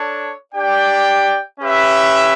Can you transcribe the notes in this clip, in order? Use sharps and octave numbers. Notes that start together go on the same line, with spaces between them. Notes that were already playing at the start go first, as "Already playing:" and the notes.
Already playing: D4 A4 C#5
D4 G4 D5 G5
C#4 G4 B4 E5